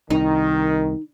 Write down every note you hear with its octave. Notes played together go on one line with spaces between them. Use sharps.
C2 D#3 D#4